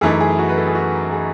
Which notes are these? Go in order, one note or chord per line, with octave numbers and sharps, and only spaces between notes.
F#2 E3 A3 D#4 G#4
G#4
F#4
B4
A4
G#4
F#4
G#4